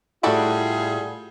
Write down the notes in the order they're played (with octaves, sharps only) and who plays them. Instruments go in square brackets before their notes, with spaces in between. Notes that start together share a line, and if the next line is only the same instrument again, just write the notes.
[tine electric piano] A2 E5 [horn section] G3 F4 G#4 [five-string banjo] D4 F#4 A4